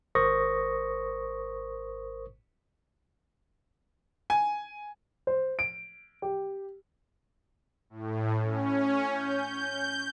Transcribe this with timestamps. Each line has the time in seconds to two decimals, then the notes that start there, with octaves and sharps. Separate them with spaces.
0.15 G#1 A#4 C5 C#6 D#6 A#6
4.30 G#5
5.27 C5
5.59 D7
6.22 G4
7.90 A2
8.42 C#4
9.10 G6